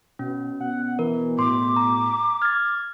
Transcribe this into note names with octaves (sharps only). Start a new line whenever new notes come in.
B2 C#4
B2 F#5
E3 A#4
A2 C6 D6
A#5
F6 G#6 A6